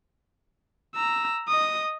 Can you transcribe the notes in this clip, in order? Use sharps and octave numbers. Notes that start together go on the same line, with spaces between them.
A#5 E6
D#5 D#6